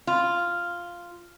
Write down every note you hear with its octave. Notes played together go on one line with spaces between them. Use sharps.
F4